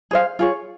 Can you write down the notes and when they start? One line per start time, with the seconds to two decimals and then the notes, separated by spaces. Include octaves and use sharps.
0.11 G#4 C5 F5
0.39 F4 G#4 C#5